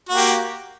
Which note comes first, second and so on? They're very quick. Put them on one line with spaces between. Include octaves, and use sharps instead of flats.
F#4 A#3 G4